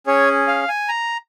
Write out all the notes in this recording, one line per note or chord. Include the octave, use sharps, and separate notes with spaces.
C#4 G#4 C#5
F5
G#5
A#5